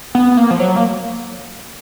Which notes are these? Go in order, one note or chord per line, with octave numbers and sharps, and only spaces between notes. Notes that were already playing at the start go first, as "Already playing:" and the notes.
B3
B3
A#3
F3
F#3
A#3